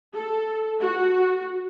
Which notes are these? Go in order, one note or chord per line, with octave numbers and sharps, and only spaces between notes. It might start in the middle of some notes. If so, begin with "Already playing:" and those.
A4
F#4